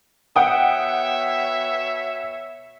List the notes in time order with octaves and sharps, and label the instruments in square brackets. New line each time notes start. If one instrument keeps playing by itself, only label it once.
[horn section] B2 C#5 E5 [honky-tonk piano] F#5 G5 D#6